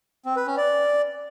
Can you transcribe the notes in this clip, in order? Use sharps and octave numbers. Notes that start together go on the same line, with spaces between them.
C4
B4
C#4
D5